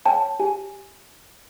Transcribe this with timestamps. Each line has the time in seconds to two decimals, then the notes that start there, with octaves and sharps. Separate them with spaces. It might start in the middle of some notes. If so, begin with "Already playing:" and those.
0.05 C#5 G5 A5
0.40 G4 G#5